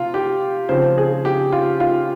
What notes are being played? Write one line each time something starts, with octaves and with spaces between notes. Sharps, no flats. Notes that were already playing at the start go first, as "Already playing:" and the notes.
Already playing: C3 F4
G4
C#3 F3 C4 C5
G#4
G4
F4
F4